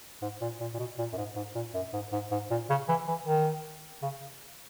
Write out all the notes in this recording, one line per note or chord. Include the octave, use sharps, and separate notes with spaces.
G#2
A#2
A#2
A#2
B2
A#2
F#2
G#2
G#2
A#2
F#2
G#2
G#2
G#2
A#2
C#3
E3
E3
D#3
C#3